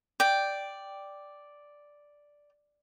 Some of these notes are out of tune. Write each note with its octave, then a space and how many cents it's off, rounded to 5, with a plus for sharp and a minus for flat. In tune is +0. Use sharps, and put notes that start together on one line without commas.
D5 +0 G5 +0